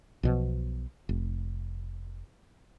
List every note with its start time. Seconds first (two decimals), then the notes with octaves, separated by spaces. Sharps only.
0.23 B1 B2 F3
1.09 F1